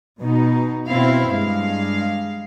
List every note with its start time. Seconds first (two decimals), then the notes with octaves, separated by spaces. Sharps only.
0.22 B2 D#4
0.88 B2 C4 E4 F5
1.31 G2 G#3 F5